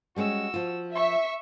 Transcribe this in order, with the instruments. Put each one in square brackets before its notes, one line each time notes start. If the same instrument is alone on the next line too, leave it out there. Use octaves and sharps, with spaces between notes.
[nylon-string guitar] G3 G#3 C#4 [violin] F#4 E6
[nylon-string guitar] F3 F4
[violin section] E5 [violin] C#6